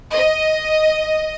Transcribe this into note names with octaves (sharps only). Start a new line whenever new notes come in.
D#5